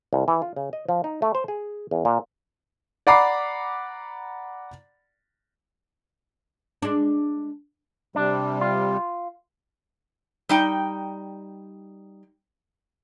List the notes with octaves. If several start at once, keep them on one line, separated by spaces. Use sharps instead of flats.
C2
E3
F4
C#3
D#5
F3
D#4
A3
C5
G#4
E2
A#2
D5 F#5 A#5 B5 D6 C7
G#3 D4
C3 G3 D4
F4
G3 D#4 G5